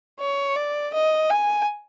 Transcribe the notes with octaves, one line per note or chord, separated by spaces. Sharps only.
C#5
D5
D#5
G#5